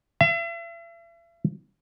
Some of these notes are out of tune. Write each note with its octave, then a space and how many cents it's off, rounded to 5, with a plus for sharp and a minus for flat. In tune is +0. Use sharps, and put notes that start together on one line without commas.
E5 +40